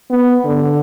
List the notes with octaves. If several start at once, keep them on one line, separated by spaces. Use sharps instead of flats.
B3
D3